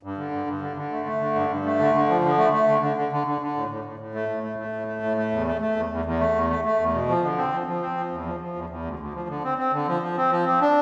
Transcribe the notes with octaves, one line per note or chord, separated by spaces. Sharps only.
G2
D3
G2
G2
D3
D3
A3
A3
D3
G2
G2
A3
D3
D3
F3
D3
A3
A3
D3
D3
D3
D3
D3
D3
A2
A2
A2
A2
A3
A2
A3
A3
A2
A3
A2
A3
E2
A3
A3
E2
E2
E2
A3
E2
A3
A3
E2
B2
F3
D3
C4
F3
F3
C4
F3
E2
F3
F3
E2
E2
D2
D2
F3
D3
C4
C4
D3
F3
F3
C4
F3
C4
D4